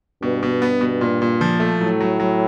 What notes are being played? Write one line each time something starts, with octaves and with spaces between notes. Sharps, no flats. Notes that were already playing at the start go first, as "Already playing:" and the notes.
G2 B2
B2
B3
B2
A#2
A#2
F3
A3
A2 F#3
F#3
F#3